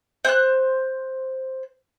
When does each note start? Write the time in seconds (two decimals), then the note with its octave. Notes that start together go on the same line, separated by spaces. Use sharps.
0.25 C5 F#6